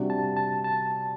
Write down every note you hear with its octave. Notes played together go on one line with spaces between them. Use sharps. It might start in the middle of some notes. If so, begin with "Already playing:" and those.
Already playing: C3 G3 D4 F#4
A5
A5
A5